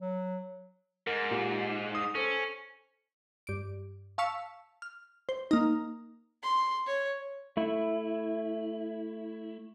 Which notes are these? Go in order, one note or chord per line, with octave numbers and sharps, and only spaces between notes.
F#3
G#2 A#4
A#2 G4
D#6
C#4 A4 C5
G2 D7
F5 A5 C#6 E6 B6 C#7
F6
C5
A#3 D#4
C6
C#5
A3 E4